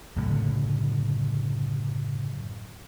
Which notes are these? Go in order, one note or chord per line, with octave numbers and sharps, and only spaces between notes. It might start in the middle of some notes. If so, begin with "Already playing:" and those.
F#1 A2 D3 F#3